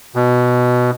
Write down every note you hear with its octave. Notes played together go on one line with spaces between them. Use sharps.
B2